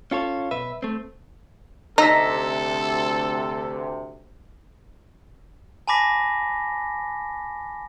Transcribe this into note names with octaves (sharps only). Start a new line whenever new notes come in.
C#4 F4 A4 C#5
B1 B2 B4 E5
A3 C4
D2 C3 D#4 A4 A#5 E6 B6
G#5 A5 B5 D6 A#6 B6